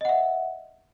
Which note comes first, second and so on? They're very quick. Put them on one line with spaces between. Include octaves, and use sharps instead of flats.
D#5 F#5 E5